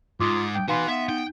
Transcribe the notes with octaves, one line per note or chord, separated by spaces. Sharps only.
G#2 F4 D6 D#6
G5
E3 D#4 F#4 F5 B5 C6
B3 E5
D#4 G5